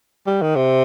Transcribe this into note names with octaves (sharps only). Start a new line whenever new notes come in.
G3
D#3
C3